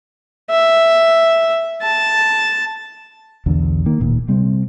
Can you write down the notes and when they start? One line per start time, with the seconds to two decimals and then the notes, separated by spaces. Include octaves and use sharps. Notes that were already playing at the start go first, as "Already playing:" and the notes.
0.51 E5
1.82 A5
3.46 B1 E2 D3
3.86 D#3 A#3
4.00 D1 A#2 D#3
4.28 C3 G3 C4